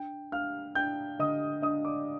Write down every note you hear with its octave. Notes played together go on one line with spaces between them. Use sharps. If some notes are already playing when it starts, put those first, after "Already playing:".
Already playing: D4 G5
D4 F5 F6
D4 G5 G6
D3 D#5 D#6
D4 D#5 D#6
D5 D6